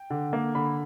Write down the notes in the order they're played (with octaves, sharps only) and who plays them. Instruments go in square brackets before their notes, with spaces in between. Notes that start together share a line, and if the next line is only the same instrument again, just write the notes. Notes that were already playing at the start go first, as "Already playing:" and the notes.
Already playing: [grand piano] G5
D3
A#3
D3 B5